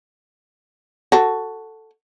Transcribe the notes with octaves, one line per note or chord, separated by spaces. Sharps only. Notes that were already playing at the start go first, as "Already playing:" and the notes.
F#4 A4